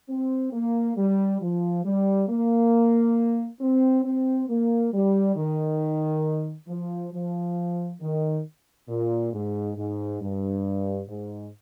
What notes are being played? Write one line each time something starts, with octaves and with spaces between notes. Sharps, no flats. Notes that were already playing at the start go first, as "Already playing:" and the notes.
C4
A#3
G3
F3
G3
A#3
C4
C4
A#3
G3
D#3
F3
F3
D#3
A#2
G#2
G#2
G2
G#2